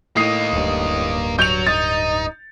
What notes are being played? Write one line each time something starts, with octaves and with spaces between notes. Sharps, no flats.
A2 A#3 D#4 D#6 C7
D1 G2
F#3 G6 C#7 F7
D#4 A6